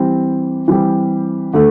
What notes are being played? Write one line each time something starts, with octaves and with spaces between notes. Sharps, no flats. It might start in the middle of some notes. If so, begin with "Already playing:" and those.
Already playing: E3 G3 C4 G4
E3 G3 C4 G4
D3 A3